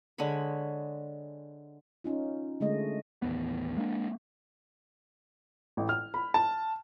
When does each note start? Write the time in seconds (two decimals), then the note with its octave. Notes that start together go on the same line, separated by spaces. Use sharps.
0.18 D3 G#3 C#5 B5
2.04 C#4 D#4 F4
2.60 D3 G#3 A3 D#5
3.22 A1 D#2 B3
3.77 G#3 A#3 C4 D4
5.77 A1
5.89 F6
6.14 B5
6.34 A5